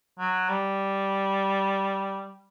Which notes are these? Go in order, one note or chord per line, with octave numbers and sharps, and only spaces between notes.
F#3
G3